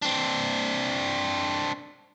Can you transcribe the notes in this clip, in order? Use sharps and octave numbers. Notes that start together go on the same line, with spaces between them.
C4 D4